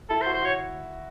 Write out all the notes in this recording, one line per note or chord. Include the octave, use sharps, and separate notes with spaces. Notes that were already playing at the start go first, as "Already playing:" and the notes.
E4 A4
C5
F#4
C5
F#4 C#5